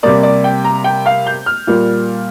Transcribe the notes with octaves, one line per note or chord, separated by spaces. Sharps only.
C3 G3 A#3 D5
D5
G5
A#5
G5
F5
G6
F6
A#2 G3 A#3